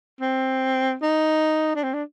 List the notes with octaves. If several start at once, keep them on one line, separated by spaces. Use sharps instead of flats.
C4
D#4
D4
C4
D4